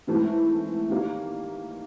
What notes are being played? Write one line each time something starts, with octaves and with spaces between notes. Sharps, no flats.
G#2 E3 A3 C4
D#3 G3 A#3